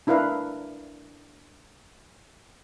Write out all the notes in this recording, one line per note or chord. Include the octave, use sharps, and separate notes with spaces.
D4 E4 A#4 B4 F5